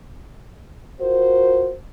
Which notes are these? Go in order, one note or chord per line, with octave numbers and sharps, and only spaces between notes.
F4 F#4 A#4 C5